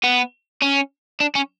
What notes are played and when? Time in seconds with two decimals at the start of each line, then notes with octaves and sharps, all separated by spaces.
0.04 B3
0.62 C#4
1.20 D4
1.35 C#4